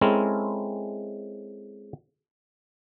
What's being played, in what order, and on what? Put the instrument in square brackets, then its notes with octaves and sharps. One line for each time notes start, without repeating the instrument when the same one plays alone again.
[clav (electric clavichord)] G#3 C4 C#4 E4 A4 A#4